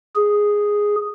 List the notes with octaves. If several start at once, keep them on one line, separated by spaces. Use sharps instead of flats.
G#4